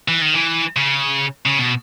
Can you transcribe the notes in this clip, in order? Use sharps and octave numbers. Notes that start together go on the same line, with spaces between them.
E3
D#3
E3
C#3
C#3
B2